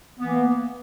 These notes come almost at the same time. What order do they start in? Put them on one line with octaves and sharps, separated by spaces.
B3 E3 A#3